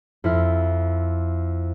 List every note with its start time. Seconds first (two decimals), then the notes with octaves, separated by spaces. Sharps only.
0.24 F2 E4 E5 F6